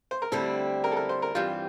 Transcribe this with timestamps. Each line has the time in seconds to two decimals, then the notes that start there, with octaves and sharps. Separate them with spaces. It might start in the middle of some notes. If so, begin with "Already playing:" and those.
0.11 C5
0.22 A#4
0.32 D2 D3 G3 C4 E4 A4
0.84 A#4
0.91 A4
0.96 A#4
1.09 C5
1.22 A#4
1.35 G2 E3 G3 C4 F4